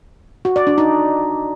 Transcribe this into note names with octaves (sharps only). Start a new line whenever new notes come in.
F#4
D5
D4
D#4